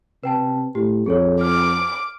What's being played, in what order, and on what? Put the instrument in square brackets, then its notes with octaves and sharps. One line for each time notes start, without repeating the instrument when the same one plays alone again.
[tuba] C3 [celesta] B4 G5 A5
[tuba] A2 [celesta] G4
[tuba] F2 [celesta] G#4 A4 C#5
[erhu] D6 [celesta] F6